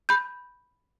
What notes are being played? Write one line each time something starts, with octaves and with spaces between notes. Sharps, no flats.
B5 G6